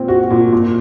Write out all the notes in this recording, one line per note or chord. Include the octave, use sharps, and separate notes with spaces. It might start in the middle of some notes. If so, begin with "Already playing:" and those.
Already playing: A#2 C4
F#4
A#2
A#2